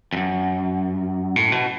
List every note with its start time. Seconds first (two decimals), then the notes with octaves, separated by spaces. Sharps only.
0.13 F2
0.17 F#2
1.36 A2
1.52 B2